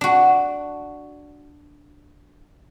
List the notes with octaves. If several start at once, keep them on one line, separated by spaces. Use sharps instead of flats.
D4 F#4